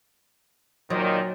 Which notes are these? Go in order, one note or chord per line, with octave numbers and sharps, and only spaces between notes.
A#2 D#3 F#3 C5 D5 D#5